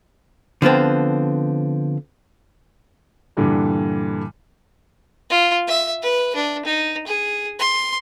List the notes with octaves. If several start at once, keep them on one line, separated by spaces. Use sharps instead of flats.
D3 F3 B3 C4
G2 A#2 D3 E3 G3
F4
E5
B4
D4
D#4
G#4
C6